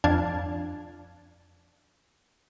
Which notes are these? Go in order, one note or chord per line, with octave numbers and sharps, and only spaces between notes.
F2 D4 F5 A5 G#6